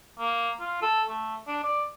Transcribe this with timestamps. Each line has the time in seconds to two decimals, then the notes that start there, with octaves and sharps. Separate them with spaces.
0.19 A#3
0.60 F4
0.82 A4
1.09 A3
1.47 D4
1.64 D5